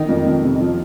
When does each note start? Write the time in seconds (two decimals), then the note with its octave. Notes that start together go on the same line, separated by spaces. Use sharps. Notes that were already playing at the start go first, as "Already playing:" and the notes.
Already playing: D#3 D#4
0.09 F2
0.26 F2
0.43 C3
0.61 F3